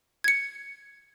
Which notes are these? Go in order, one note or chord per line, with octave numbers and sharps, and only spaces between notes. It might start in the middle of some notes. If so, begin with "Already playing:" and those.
G#6 C#7